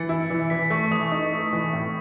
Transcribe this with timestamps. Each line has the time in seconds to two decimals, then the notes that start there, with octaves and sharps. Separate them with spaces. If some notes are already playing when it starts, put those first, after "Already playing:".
Already playing: E3 A6 C#7
0.09 E4
0.30 E3
0.50 E3 B6
0.70 A3 C#6
0.91 E3 D#6
1.12 D#4
1.33 A3
1.53 E3
1.73 A2